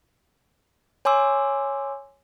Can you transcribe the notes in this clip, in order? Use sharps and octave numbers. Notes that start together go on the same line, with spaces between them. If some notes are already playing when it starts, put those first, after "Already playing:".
C#5 G#5 C6 D6 E6